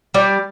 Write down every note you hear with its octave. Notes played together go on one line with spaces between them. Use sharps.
G3 D5